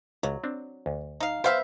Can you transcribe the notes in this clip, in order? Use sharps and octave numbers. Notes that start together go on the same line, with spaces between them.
C#2 F#3
C4 D4
D2
D#4 F5
B3 B4 C5 E5 F5